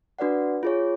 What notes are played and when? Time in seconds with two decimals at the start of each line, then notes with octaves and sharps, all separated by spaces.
0.19 D4 F#4 B4 D5 F#5
0.63 F4 G#4 C#5